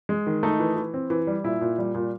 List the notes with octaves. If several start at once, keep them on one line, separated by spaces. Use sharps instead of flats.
G#3
D#3
A3 D#4
E3
E3
C4
E3
G3
A#2 E4
A#2
G3
A#2